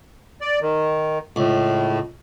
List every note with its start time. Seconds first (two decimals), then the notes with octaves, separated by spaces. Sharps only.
0.41 D5
0.62 D#3
1.36 C#2 A2